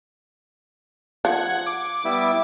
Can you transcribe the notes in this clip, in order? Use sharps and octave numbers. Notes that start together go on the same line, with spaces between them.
F3 F#5 G#6
D6
G3 B3 E4